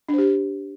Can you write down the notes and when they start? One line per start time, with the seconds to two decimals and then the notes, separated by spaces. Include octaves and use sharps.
0.09 D4
0.13 C5
0.18 G4